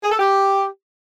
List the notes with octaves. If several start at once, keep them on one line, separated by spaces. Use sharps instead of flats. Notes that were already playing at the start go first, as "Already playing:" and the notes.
G#4
A4
G4